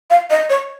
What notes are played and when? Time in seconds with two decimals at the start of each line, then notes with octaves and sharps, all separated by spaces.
0.10 F5
0.30 D#5
0.50 C#5